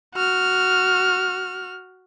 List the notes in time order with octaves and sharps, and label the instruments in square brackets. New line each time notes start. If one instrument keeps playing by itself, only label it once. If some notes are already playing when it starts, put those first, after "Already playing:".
[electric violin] F#4 F6